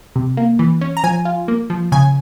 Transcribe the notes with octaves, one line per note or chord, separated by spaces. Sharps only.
C3
A#3
E3
C#4
A#5
F3 G#5
F4
A#3
F3
C#3 G#5